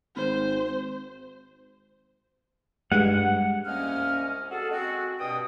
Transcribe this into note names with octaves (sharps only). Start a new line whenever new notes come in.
G#1 C5
G2 G#3 F#5
C2 A#3 C#4 D#5 F6
F#4 G#4 A4
G#3 C4 F#4
G2 B2 G5 D#6